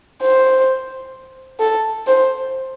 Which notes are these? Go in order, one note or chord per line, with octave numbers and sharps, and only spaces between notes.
C5
A4
C5